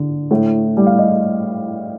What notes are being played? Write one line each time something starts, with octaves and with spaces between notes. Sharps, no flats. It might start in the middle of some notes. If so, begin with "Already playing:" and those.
Already playing: D3
A2
G3
F5
D#5